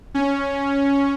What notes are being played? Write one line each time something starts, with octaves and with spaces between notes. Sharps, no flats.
C#4